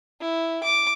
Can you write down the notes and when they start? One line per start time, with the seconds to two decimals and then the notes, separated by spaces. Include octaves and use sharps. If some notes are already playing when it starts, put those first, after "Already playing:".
0.21 E4
0.64 D6